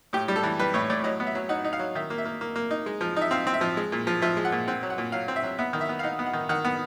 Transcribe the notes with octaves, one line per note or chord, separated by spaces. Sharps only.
A2 G4
G3
A4
E3
G3 B4
A2 C#5
A2 D5
F#3 D#5
B3
E5
F#3
D#4 F#5
D#4
F5
F#3
D#3 E5
A#3
E5
A#3
A#3
A#3
D#4
G#3
F3
D#4 E5
C4 F5
C4
E5
F3
G#3
A#2
F3
F3 E5
G#3
F#5
A#2
C4 F#5
F#3
F#5
A#2
F#3 F5
C4
E5
F#3
B3 E5
D#3
E5
B3
F5
D#4 F#5
B3
F#5
D#3
D#3 F#5
B3